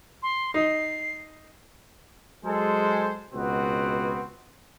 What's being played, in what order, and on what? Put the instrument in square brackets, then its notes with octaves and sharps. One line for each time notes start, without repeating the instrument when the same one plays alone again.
[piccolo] C6
[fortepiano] D#4 [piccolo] C7
[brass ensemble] F#3 G#3 G#4 A4 C5
C#2 B2 B3 C4 F#4